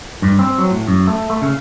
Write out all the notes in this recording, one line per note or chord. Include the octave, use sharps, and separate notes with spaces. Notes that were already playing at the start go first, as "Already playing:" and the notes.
G2
C4
F#3
A2
F#2
A3
A3
C#3